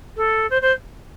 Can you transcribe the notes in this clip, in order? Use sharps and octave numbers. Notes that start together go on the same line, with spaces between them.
A4
C5
C5